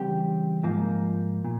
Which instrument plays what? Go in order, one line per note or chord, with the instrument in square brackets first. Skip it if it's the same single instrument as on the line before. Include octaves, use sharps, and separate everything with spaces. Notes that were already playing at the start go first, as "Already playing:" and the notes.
Already playing: [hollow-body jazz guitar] C#3 E3 G3 C4 G4 G5
G#2 F3 A#3
A#2